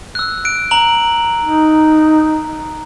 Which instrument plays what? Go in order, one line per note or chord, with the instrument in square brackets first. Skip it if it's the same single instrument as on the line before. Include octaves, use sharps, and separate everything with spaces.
[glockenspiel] E6 F#6
F#6 D7
A#5 F#7
[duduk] D#4